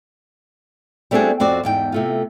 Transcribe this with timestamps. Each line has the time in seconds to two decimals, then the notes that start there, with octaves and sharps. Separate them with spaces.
1.11 G3 A3 C4 D4 F#4 G#4
1.40 F2 C4 F#4 D5
1.63 E2 G#2 G5
1.92 C3 A3 F4